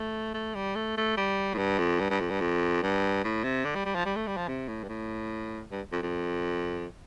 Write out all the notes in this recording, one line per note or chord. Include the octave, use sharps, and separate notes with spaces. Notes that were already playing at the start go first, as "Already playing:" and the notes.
Already playing: A3
A3
G3
A3
A3
G3
A2
G2
F2
G2
G2
F2
G2
F2
G2
A2
C3
D3
G3
G3
F3
G3
A3
G3
F3
C3
A2
G2
A2
G2
F2
F2